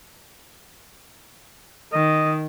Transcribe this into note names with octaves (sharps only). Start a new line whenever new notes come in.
D#3 D#5